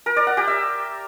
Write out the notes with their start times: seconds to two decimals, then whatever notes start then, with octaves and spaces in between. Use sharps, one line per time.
0.06 A#4
0.16 D5
0.27 F#5
0.37 G4
0.48 E5